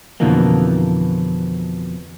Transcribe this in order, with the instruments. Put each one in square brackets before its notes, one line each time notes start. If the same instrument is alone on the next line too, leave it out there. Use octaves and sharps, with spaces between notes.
[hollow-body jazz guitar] F2 B2 D3 E3 F3 A#3